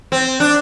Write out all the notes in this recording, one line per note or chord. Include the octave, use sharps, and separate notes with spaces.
C4
D4